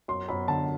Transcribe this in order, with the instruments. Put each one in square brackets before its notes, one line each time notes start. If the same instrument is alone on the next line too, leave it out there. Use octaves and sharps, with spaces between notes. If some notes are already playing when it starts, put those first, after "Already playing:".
[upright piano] F#2 C6
F#2 B5
D3 A5